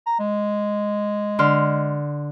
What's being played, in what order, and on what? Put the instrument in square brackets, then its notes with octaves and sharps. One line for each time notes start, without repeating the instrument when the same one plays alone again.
[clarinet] A#5
G#3
[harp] D3 C6 F6